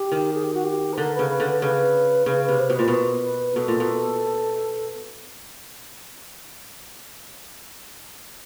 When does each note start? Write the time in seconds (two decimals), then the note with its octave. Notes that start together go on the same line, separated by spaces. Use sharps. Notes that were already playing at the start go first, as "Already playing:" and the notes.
Already playing: G4
0.12 D#3
0.33 G#4
0.43 G4
0.54 F#4
0.63 G4
0.93 B4
0.98 D3 A#4
1.14 B4
1.19 C#3
1.29 B4
1.40 D3
1.46 B4
1.62 C#3 B4
2.26 C#3 B4
2.43 B4
2.49 C3
2.59 C5
2.70 B2
2.75 A#2 B4
2.88 B2
3.24 B4
3.55 B2 A4
3.68 A#2
3.80 B2